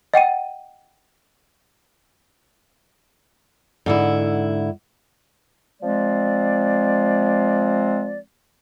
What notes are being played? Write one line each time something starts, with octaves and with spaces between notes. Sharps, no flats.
D#5 F#5 G5 D#7
G#2 D3 E4
F3 G#3 C4 D5